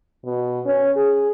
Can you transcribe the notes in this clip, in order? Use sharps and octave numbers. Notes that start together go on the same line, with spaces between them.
B2
C#4
G#4